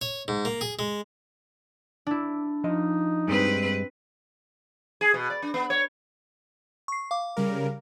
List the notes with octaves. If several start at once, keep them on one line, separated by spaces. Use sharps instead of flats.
C#5
G#2
A#3
G#4
G#3
D4 E4
F3 D#4 D#5
G2 G3 G#3 C4 B4
G#4
B2
D5
D4
B3
C#5
C#6 C7
F5 D6
C#3 G3 A#4